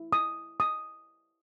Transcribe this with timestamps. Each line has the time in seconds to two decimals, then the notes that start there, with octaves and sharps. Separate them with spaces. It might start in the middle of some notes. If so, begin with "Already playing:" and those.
Already playing: E4
0.13 D#6
0.60 D#6